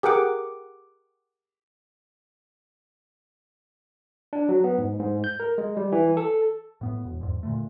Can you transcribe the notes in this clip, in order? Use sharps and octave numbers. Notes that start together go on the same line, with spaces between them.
G4 G#4 A#4 F#5 D6
D4
F#3
B3
G#2
G#2
G6
A#4
G#3
G3
E3
A4
A2 B3
E1
E2 G#2
A#2 D3 A3